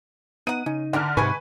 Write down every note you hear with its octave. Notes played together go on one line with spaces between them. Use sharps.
B3 D#4 F#5 D#7
C#3 C#4 D#4
D3 E3 D4 A#4 F6
G#2 C3 G#3 B4 G#5 C#6